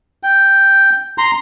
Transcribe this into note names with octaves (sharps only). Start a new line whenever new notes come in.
G5
A#5 C6